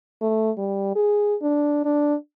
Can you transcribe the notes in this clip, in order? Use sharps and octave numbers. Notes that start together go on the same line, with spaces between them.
A3
G3
G#4
D4
D4